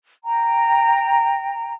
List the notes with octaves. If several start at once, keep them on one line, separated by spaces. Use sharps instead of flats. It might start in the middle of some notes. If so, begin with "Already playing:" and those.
G5 A#5